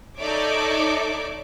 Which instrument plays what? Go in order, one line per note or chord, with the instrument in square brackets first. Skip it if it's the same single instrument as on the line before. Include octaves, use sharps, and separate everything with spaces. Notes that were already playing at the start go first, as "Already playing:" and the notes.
[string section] D#4 A4 C#5 D5 E5 D6